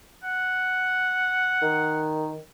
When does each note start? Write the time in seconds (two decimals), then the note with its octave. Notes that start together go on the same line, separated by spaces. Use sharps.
0.23 F#5
1.62 D#3